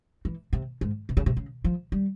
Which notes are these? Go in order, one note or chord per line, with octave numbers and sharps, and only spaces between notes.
E3
C3
G#2
C3
C#3
C3
C#3
F3
G3